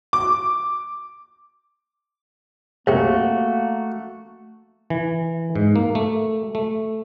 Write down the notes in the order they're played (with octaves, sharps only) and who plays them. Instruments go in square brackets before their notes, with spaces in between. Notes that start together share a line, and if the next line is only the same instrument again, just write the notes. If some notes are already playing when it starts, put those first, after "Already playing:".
[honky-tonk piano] D6
[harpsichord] C2 C3 [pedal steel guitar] A3 F#4 [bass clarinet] A#3
[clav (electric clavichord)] E3
G#2
A#3
A3
A3